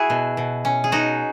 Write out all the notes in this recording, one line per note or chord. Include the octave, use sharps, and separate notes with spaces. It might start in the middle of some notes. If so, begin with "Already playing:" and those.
Already playing: E4 F#4 G#4
B2
B2
C#4
G#4
B2 D#4 F#4